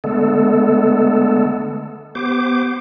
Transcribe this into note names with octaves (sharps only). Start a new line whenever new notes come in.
D3 G#3 A3 B3 A4
B3 G4 C5 D6